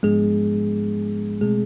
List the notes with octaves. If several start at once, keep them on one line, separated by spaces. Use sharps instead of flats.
G#2 F3 G#3 B3 D4 G#4
B2 G#3 A3 C4 G#4